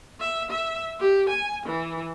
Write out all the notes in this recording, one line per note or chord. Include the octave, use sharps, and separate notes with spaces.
E5
E5
G4
G#5
E3